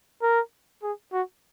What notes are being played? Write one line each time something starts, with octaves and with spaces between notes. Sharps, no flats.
A#4
G#4
F#4